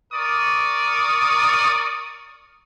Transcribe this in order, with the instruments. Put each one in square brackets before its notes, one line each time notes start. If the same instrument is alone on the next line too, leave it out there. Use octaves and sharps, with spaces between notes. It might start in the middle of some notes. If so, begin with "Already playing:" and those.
[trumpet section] A#4 D5 C#6 D#6